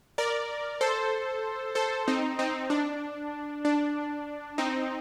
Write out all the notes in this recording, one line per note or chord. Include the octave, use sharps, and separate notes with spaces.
A#4 D5
A4 C5
A4 C5
C4 D#4
C4 D#4
D4
D4
C4 D#4